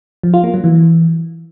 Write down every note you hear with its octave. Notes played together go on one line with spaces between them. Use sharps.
F3
F4
A#3
F#3
E3